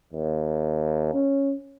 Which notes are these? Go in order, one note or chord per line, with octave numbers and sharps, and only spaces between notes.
D#2
C#4